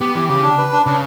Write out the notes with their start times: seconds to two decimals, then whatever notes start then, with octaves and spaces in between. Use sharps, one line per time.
0.01 B3 G4
0.15 E3 G4
0.29 C#3 G4
0.43 D4
0.58 B4
0.72 D4
0.86 C#3 D4